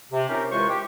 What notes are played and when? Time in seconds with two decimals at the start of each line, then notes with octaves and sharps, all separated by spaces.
0.12 C3
0.29 C4 C#4 D#4 F4 G4 A#4
0.51 D#2 E3 G#3 F4 C5 C#6
0.68 G4